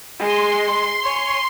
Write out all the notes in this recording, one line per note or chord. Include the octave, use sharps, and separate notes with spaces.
G#3 C6
C#5 G#5